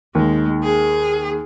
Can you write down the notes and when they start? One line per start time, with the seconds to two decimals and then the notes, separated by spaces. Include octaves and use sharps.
0.15 D#2 G#3
0.63 G#4